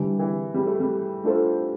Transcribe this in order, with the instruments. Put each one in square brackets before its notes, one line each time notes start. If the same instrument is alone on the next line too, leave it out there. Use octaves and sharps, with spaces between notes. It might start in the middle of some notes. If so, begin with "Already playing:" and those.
Already playing: [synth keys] D3 G3 D4 G4 [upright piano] E3
[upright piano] E3
G3
A3
G3
[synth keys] A3 D4 F4 A4 C5